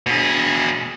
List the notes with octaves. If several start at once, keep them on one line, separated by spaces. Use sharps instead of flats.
B2 G#4